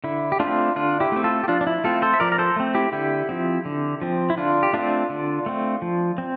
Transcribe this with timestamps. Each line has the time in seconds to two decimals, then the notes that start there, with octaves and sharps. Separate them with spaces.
0.04 D3 E4
0.32 G4
0.40 A3 C4 D4 F4
0.76 D3 D4 F4
1.00 E4 G4
1.12 A3 C4
1.24 F4 A4
1.44 G4
1.48 F3 D4 F4
1.61 D4
1.67 E4
1.84 A3 C4 F4 A4
2.02 A4 C5
2.14 E5
2.20 F3 A#4 D5
2.32 A#4
2.38 A4 C5
2.56 A3 C4
2.75 E4 G4
2.92 D3 E4 G4
3.29 F3 C4
3.65 D3
4.02 F3 C4
4.30 E4
4.37 D3 D4 F4
4.63 G4
4.73 A3 C4 D4 F4
5.10 D3
5.46 A3 C4
5.82 F3
6.18 C4